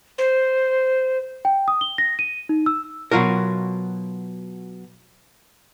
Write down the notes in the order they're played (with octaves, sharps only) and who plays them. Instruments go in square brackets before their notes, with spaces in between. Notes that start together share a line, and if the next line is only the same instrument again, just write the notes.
[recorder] C5
[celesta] G5
D#6
G7
A#6
D#7
D#4
E6
[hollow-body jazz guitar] B2 F#3 F4 F#4 A#4